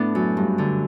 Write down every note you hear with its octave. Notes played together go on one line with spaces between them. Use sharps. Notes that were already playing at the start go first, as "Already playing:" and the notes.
Already playing: A2 B3 D4
F#2
G2
D3